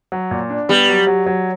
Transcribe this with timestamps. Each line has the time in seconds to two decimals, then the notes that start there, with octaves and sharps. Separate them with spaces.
0.12 F#3
0.31 A#2
0.50 D4
0.69 G3 B3
0.88 F#3
1.07 F#3
1.26 F#3